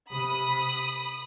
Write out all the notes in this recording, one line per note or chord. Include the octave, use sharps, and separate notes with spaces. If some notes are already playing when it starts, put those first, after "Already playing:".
C3 B5 D#6